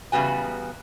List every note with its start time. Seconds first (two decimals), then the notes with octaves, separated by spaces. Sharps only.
0.12 E2 C#3 G3 B3 F#4 G#5